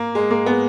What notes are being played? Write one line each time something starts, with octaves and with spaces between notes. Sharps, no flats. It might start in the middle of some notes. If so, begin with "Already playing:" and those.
Already playing: A#3
G#3
A#3
G#3 B3